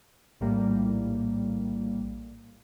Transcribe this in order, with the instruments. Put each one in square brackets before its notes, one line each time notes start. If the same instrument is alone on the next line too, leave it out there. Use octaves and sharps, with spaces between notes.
[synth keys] A#1 A2 G3 A#3